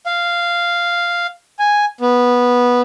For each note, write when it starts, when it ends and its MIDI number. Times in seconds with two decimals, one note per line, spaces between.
0.06 1.27 77
1.59 1.85 80
2.01 2.82 59